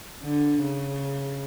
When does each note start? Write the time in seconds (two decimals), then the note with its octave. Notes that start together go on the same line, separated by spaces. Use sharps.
0.23 D3
0.62 C#3